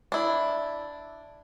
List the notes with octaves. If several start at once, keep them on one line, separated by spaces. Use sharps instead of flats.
D4 E4